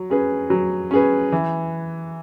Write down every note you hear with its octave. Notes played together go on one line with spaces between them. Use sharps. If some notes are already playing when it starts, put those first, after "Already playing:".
Already playing: F#3
C#4 G#4 B4
F#3
C#4 G#4 B4
E3